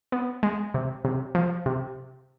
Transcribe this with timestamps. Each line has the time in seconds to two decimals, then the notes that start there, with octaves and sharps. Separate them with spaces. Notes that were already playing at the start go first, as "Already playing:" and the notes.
0.12 B3
0.43 G#3
0.74 C3
1.05 C3
1.35 F3
1.66 C3